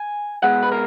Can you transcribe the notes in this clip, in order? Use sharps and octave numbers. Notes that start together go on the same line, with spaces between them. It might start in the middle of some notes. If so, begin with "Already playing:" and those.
Already playing: G#5
B2 G#3 B3 F#5
B4
A#4